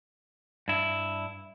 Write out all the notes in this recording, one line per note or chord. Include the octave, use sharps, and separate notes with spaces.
G2 E4